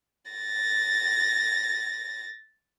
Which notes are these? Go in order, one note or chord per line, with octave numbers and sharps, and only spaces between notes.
A6 A#6